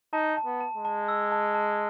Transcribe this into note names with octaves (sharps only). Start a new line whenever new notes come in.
D#4 A5
A5
B3
A5
G#3
A5
E6
A5
A5